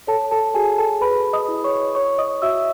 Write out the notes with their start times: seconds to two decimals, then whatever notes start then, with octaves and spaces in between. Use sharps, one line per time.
0.07 A4 C#5 A5
0.31 A4 A5
0.54 F#4 G#4 G#5
0.78 A4 A5
1.01 G#4 B4 B5
1.33 D#5 D#6
1.48 E4
1.64 C#5 C#6
1.95 C#5 C#6
2.18 D#5 D#6
2.42 F#4 E5 E6